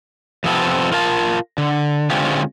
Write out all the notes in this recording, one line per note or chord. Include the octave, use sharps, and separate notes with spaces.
F2 C3 F3 B3 C4 A4
F4 A#4 F5 A5
D3
D3 G#3 C4 C#4 F4 G4